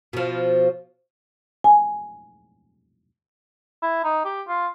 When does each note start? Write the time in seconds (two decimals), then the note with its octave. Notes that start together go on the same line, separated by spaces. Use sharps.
0.13 B2 F3
1.64 G#5
3.83 E4
4.04 D#4
4.25 G4
4.47 F4